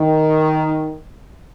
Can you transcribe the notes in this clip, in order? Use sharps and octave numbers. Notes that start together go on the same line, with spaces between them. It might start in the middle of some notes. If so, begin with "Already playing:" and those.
Already playing: D#3